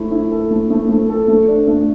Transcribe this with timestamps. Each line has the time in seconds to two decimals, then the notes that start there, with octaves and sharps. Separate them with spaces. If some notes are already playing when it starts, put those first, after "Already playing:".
Already playing: A3 E4
0.11 E4
0.31 A4
0.51 A3
0.70 A3
0.89 A3
1.09 A4
1.28 A3
1.48 D4
1.68 A3